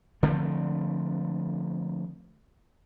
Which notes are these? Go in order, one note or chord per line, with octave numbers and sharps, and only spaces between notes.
D3 F3 A3 C4